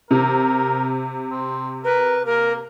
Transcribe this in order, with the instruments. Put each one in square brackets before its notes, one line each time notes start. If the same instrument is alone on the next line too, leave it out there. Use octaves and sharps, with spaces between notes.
[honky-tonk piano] C3 [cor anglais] A#4
[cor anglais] C4
[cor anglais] A#4 [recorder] B4
[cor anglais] A#3 [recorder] A#4